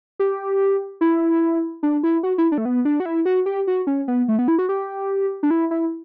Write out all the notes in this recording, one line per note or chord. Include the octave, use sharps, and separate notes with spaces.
G4
E4
D4
E4
F#4
E4
D4
A3
B3
D4
F#4
E4
F#4
G4
F#4
C#4
B3
A3
B3
E4
F#4
G4
D4
E4
E4